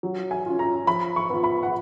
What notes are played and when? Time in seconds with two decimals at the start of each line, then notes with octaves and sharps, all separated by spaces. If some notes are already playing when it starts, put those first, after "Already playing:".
0.03 F#3
0.31 G#5
0.46 C#4 F4
0.59 A#5
0.87 F3 B5
1.16 C#6
1.30 B3 F4
1.44 B5
1.63 F#5